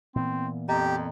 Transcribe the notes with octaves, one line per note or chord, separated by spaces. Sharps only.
A#2 E3 B3 C4
F2 G4 D#5 A#5